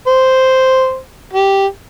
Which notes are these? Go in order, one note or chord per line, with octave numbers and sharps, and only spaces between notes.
C5
G4